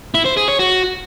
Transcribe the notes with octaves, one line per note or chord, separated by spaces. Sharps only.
E4
C5
G#4
C#5
F#4